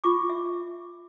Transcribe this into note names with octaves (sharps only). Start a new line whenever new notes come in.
F4 C#6 D6
E5